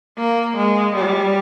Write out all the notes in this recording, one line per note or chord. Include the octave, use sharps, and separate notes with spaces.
A#3
G#3
G3